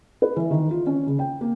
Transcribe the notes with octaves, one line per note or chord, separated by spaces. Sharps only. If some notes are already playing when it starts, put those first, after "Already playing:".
B4
E3
D#3
F4
C#4
C#3
G5
A#3